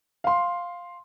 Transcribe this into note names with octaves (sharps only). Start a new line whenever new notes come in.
F5 C6